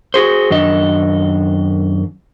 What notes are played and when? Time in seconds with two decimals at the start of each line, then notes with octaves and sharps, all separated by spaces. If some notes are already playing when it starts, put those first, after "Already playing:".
0.14 F#4 G#4 C5
0.50 F#2 D#3 D4 D#5